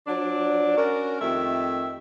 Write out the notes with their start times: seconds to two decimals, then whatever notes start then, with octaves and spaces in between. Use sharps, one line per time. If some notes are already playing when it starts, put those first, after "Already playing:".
0.07 F3 F#3 D4
0.77 C#4 D4 F#4 A#4
1.21 F2 D#3 A3 G4 E5